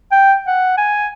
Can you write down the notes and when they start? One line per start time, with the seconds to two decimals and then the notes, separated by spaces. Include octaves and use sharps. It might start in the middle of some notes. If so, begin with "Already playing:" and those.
0.12 G5
0.47 F#5
0.77 G#5